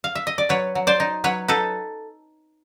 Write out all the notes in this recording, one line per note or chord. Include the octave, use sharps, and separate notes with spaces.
F5
E5
D#5
D5
F#3 B4 C#5
F#3
C5 D5
D#4
F#3 B4 C#5
D#4 A4 B4